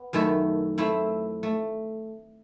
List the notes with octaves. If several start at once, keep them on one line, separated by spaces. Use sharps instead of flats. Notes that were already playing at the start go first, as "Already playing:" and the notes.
Already playing: B3
F#2 D#3 A3 E4 A4
A3 C4 E4
A3